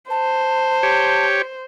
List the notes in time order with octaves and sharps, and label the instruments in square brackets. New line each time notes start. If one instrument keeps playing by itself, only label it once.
[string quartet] C5 [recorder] A5
[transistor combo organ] G4 C#5